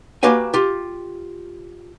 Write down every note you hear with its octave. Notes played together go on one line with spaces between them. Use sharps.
A#3 F#4 G4 B4 F5 G#5
F4 G4